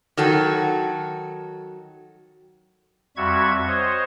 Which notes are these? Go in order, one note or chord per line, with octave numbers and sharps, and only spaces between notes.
D#3 F#3 F#4 A4
F2 G3 F#4 E5 C#6 G#6
C5 C#5 D#5